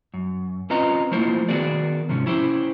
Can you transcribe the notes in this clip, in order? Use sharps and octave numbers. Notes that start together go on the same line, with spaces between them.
F#2
C4 C#4 F4 B4 D#5 A#5
F3 A3 A#3 E4 F4 C5
D#3 B3 F#4 G#4 A#4 D5
G#2 C3 F3 C#4
C#4 E4 G4 C5